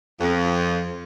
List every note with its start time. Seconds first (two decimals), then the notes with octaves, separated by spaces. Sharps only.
0.21 F2